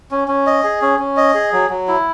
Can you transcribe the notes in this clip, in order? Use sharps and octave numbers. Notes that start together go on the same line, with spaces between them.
C#4
C#4
D#5
G#4
C#4
C#4
D#5
G#4
F#3
F#3
E4